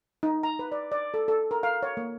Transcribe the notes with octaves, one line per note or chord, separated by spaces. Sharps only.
D#4
A#5
B4
D5
D5
A4
A4
A#4
F5
C#5
A#3